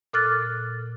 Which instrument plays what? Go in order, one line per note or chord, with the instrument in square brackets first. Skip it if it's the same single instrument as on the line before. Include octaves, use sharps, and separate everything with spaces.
[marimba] A#2 A4 D6 F6 F#6 A6